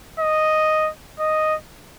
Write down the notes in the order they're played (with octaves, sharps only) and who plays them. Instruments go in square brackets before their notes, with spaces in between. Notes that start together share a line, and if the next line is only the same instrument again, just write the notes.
[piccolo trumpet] D#5
D#5